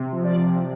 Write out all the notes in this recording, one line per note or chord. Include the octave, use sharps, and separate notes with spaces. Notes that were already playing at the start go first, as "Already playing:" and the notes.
Already playing: C3
F3
D5
C3